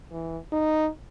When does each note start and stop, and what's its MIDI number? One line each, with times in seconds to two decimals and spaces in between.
0.12 0.37 52
0.52 0.89 63